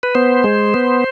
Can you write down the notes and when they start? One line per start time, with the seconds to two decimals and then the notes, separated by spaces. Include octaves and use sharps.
0.03 B4
0.15 B3 C5
0.44 G#3
0.74 B3